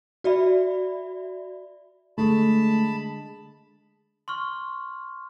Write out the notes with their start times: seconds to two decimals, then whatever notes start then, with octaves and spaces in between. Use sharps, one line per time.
0.24 F#4 D5 E5 B5
2.18 D3 G#3 A3 A5 B5
4.28 C6 C#6 F6